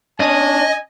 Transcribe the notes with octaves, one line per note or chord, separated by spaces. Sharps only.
C#4 D4 D#5 G#5